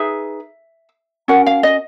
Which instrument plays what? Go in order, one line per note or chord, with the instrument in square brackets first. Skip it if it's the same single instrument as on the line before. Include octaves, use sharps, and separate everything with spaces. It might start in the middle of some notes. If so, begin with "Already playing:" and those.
Already playing: [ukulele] D#4 G#4 B4 E5
C#4 F#4 A#4 F#5
F5
D#5